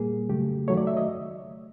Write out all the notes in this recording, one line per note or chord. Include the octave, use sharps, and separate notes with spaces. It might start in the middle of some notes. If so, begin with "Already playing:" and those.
Already playing: A#2 G3 A#3 G#4
C#3 F#3 A3 G4
D#3 F#3 A3 C#5
D5
E5
D#5